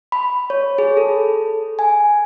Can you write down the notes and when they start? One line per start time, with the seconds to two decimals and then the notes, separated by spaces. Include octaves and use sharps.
0.12 B5
0.50 C#5
0.78 G#4
0.97 A4
1.79 G#5